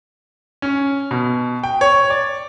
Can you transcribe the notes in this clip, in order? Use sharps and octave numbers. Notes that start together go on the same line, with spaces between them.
C#4
B2
G5
C#5
D5